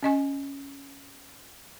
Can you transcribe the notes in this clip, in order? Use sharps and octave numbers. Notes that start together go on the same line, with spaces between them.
C#4 D#5 G#5